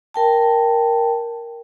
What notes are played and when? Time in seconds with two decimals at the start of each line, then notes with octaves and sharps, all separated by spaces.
0.14 A#4 G5 A5